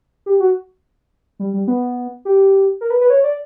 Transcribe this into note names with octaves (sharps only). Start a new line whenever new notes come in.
G4
F#4
G3
G3
B3
G4
A#4
B4
B4
C#5
D5